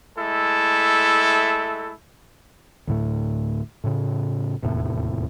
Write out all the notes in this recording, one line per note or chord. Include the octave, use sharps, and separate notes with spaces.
G#3 A3 E4 A4
D2 A2 A3
A2 C#3
D#1 E2 A2 C3